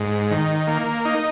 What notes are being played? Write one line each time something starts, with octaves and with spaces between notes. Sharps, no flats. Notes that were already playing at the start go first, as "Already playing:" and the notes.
Already playing: G#2
D#3
A#3
D#4